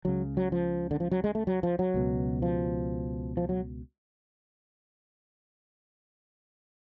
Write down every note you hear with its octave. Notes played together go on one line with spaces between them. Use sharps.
C#2 C#3 F#3
F#3
F3
D3
F3
F#3
G#3
A3
F#3
F3
F#3
C#2 B2
F3
F3
F#3